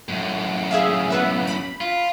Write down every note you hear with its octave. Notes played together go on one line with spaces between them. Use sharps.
F#2 A2
G#4 E5 F5
B3 B4 E5
B5
F4